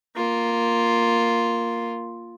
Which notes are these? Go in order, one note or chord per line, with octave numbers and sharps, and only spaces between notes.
A#3 F4